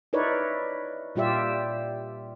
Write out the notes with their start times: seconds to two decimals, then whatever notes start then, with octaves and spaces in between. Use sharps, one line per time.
0.13 D#4 E4 A#4 B4 C#5 D5
1.15 A#2 G3 F4 G4 D5 E5